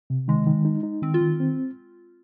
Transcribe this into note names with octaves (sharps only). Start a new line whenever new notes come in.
C3
D#3 G#3
D#3
D#4
D#4
D#3 C4
F4
D#3
C4